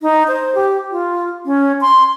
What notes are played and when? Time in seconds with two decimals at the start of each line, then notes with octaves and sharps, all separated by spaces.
0.01 D#4
0.28 C5
0.55 G4
0.91 F4
1.46 C#4
1.81 C6